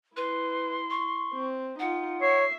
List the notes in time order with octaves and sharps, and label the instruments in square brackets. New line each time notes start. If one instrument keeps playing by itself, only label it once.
[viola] E4 [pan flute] B4 [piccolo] C6
[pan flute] C#6
[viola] C4
[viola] D#4 F4 [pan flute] F#5
[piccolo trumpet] C#5 [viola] E5 [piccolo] C7